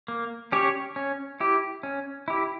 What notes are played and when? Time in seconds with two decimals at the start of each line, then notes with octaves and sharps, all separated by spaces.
0.08 A#3
0.52 C#4 G4 C#5
0.96 C#4
1.40 E4 G4
1.83 C#4
2.28 E4 G4